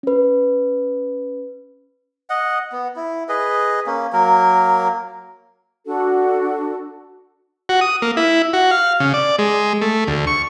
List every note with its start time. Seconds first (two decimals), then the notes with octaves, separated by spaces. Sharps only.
0.03 C#4 B4
2.30 D#5 F#5
2.72 B3
2.96 E4
3.29 G#4 B4 D#5
3.86 A#3 C#4
4.13 F#3 A#3 A#4
5.86 D4 F#4 A4
7.69 F#4
7.81 D#6
8.02 A#3
8.17 E4
8.53 F#4
8.71 F5
9.00 C#3
9.14 D5
9.39 G#3
9.82 A3
10.07 D2
10.27 C#6